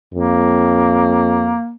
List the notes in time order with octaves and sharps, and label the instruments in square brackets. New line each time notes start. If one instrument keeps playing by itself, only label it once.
[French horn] F2 [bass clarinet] A#3